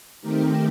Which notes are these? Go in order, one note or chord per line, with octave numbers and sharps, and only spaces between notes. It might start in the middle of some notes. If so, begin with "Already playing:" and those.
D#3 A3 C4 D#4 G4 A#4